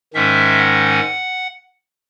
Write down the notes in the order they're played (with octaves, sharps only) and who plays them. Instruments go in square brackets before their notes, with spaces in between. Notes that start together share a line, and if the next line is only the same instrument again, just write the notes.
[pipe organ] G#2 D#3 G#3 C#4 E5
F#5